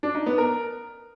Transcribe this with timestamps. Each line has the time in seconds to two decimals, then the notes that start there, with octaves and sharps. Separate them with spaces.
0.03 D4
0.15 D#4
0.26 B3
0.38 A#4